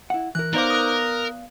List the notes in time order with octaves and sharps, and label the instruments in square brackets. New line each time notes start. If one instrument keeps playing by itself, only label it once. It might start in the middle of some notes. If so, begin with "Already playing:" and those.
[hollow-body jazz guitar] E4 F#5
[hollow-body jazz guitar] E3 A#4 [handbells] F#6
[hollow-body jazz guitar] B3 D5 F5 [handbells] D#4 C5 D6 [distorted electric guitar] A#4
[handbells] D#6 F#6